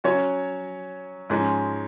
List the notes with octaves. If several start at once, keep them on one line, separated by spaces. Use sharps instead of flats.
F#3 C#4 F#4 C#5
G#2 F3 G#3 C#4